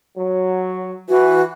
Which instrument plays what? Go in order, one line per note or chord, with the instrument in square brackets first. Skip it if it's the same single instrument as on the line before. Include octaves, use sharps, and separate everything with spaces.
[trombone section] F#3
[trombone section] E3 [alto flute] F#4